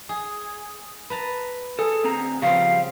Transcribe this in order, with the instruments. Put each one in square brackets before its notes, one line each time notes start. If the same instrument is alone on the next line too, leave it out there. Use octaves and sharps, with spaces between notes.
[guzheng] G#4
B4 A5 A#5
[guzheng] G#4 [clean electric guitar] A4
[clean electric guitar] D2 C4 A#5
[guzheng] C#3 C4 [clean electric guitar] F3 G3 [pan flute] F5